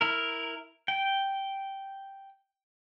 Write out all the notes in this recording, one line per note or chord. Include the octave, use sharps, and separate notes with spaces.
E4 A#4
G5